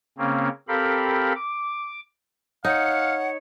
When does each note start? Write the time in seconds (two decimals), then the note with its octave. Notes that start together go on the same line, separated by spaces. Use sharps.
0.18 C#3 A#3 C4 C#4
0.68 C4 G4 A4 A#4 F5 B5
1.35 D6
2.65 D#4 C#5 F5 F#5